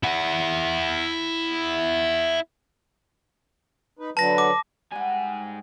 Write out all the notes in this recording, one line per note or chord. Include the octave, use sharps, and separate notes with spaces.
E4 F#5
D#4 B4
D3 F#3 B4 A5 A#6
D6
G#2 G3 F#5 G#5